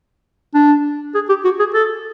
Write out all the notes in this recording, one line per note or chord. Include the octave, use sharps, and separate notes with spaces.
D4
G#4
G4
F#4
G#4
A4